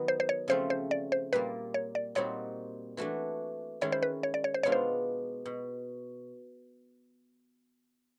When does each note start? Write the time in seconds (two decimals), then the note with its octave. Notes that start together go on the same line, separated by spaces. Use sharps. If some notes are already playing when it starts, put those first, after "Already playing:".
Already playing: D#3 F#3 B3 D#4
0.08 C5
0.20 C5
0.29 C#5
0.48 C#3 F3 A3 C4 C5
0.70 C5
0.91 D5
1.12 C5
1.33 A#2 G3 A#3 B4
1.74 C#5
1.95 D5
2.15 A#2 G3 C4 D#4 F#4 C#5
2.97 E3 A3 D4 F#4
3.81 D#3 G#3 C#4 E4 C#5
3.92 C5
4.03 B4
4.23 C#5
4.34 D5
4.44 C#5
4.54 C5
4.63 B2 G#3 B3 D4 F4 C#5
4.72 C5
5.45 B2